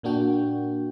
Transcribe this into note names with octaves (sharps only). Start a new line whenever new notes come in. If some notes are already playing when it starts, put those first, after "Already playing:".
A#2 A#3 D4 F#4 G5